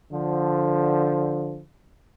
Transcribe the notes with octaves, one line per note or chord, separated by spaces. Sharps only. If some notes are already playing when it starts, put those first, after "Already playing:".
D3 F3